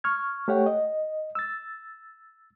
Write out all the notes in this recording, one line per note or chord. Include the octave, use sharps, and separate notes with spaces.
C#6 F6 G#6
A3 G4 C#5 F#5 G5
D#5
E6 A6